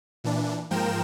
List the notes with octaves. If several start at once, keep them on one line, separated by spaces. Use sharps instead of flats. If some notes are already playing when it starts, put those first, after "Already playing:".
A#2 E3 D4
G#2 F3 A#3 A#4 G5 E7